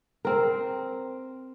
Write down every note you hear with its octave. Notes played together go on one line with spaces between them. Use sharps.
C4 A#4